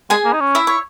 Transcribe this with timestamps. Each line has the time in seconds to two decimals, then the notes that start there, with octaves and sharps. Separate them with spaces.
0.10 G#3 G#4 G#5
0.25 A#3
0.33 D#4
0.40 C#4
0.55 E4 E5
0.67 C#5